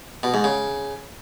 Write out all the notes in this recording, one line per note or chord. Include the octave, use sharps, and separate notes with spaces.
B2
G#2
C#3